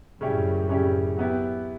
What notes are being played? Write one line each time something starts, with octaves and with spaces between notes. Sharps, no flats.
F#2 A2 C#3 G3 C#4 E4 G4
C#3 G3 C#4 E4 G4
F#3 B3 E4 G4